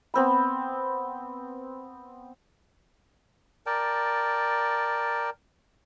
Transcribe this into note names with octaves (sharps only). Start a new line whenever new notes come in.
B3 C4 B5
A#4 D5 G5 A5